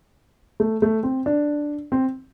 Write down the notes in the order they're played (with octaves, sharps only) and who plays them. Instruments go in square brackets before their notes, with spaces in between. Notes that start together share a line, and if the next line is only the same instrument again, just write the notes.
[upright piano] A3
A3
C4
D4
C4